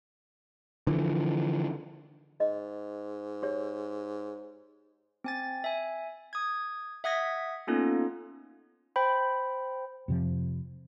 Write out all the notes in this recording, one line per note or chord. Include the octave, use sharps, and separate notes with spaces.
D3 E3 F3
G#2 D#5
G4 C#5
C4 G#5 A6
E5 G#5
D#6 G#6
E5 F#5 D#6 G#6 A#6 B6
A#3 B3 C#4 D#4 F4 A4
C5 G5 B5
F2 C3 F3